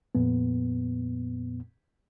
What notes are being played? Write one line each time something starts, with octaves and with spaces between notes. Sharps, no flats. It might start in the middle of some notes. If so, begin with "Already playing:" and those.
F2 A#2 B3